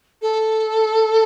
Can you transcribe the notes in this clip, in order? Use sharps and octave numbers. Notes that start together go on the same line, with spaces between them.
A4